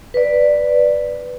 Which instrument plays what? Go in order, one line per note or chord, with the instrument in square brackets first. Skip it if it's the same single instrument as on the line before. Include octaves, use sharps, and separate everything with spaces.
[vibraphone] B4 D5